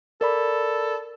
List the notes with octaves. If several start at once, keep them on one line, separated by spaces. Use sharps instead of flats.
A4 A#4 D5 B5